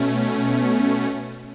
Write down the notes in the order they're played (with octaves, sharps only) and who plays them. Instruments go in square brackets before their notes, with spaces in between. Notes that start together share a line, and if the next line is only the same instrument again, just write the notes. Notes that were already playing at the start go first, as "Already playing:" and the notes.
Already playing: [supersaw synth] B2 A3 C#4